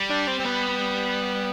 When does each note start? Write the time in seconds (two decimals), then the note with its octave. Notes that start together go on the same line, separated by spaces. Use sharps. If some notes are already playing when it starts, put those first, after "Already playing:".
Already playing: G3
0.10 D4
0.27 C4
0.40 C4
0.45 B3